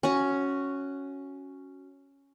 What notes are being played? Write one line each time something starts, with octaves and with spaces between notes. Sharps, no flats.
C#4 F#4